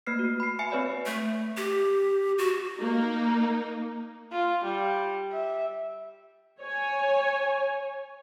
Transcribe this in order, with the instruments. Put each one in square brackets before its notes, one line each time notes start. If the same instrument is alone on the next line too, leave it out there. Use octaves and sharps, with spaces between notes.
[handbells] A3 A#3 B4 F6 C7
F#4
B5 C7
E5 G#5 B5 C7 C#7
C4 B4 C#5 D5 G#5 B5
[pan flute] A3
G4
F#4
[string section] A#3 D#4
[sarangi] F4
G3
E5
[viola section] C#5 G#5